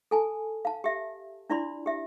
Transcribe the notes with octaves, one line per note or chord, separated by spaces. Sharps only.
A4 G#5 A5
F5 A5
G4 E5
D4 E4 F4 D5 B5 C6
G4 E5